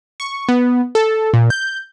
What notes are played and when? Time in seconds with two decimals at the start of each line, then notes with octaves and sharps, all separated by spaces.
0.20 C#6
0.49 B3
0.95 A4
1.34 A#2
1.50 G6